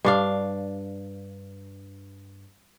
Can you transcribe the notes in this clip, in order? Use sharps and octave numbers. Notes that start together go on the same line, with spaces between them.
G2 D4 F5